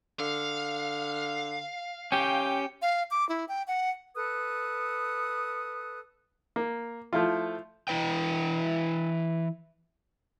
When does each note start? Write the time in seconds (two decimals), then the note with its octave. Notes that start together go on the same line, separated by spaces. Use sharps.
0.20 D3 F5
2.12 C#4 G4 G5
2.82 F5
3.11 D6
3.29 E4
3.49 G5
3.67 F#5
4.15 A4 B4 D#6 F#6
6.56 A#3
7.13 F3 A3 E4 F4
7.88 E3 E4 B4 G5